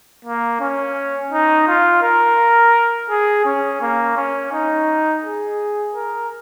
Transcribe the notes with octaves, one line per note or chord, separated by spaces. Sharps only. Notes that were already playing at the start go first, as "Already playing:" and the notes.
A#3
C#4
D#4
F4
A#4
G#4
C#4
A#3
C#4
D#4
G#4
A#4